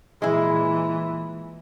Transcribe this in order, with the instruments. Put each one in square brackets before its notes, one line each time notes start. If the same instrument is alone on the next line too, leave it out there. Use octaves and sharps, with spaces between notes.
[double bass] A#2 E3 [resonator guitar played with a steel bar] G#3 E4